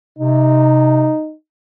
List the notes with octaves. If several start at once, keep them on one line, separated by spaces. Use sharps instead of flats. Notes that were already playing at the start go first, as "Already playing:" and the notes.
C3 D#4